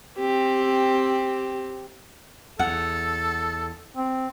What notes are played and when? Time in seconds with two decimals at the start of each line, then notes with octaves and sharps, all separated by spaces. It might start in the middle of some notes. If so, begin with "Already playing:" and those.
0.18 C4 G4
2.59 E2 A4 F#5
3.97 C4